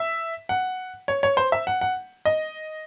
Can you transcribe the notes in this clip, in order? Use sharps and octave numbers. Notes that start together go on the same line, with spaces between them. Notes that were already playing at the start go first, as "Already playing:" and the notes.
Already playing: E5
F#5
C#5
C#5
C5
E5
F#5
F#5
D#5